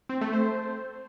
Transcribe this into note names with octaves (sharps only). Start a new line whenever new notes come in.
C4
A3
C5